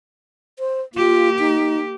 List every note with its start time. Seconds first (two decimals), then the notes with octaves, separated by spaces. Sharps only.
0.59 C5
0.95 A#3 F4 G4
1.39 D#4